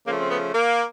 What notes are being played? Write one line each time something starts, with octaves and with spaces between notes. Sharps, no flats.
C#3 F3 A3 A#3
C4
B3
A#3